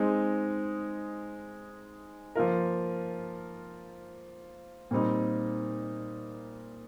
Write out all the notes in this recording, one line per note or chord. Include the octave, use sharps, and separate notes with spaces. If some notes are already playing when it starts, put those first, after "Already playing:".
Already playing: G#3 C4 D#4
F3 A#3 F4 A#4
A#2 G3 C4 D#4